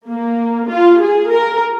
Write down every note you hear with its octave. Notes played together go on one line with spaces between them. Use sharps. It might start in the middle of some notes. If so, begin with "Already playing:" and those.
A#3
F4
G#4
A#4